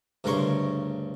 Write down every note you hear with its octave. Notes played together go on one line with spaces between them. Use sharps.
D2 G2 C#3 A#4 C6 C#6